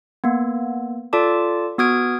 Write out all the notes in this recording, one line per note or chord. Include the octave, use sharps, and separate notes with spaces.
A#3 B3
F4 A4 D5 A5 D6
B3 F#4 D#6 F6 G#6 D7